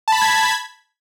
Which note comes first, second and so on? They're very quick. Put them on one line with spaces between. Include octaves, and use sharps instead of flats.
A5 B5 B6 G#6